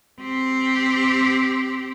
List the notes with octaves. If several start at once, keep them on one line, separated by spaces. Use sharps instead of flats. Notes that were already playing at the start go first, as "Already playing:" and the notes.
C4 G4